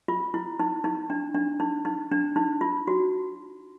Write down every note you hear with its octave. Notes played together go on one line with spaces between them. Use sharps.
F4
E4
D#4
D#4
D4
D4
D#4
D#4
D4
D#4
F4
F#4